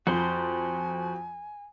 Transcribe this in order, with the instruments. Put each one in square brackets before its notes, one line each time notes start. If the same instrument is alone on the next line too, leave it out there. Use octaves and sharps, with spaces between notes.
[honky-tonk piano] F2 [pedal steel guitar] F#4 C5 C6 [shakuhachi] G#5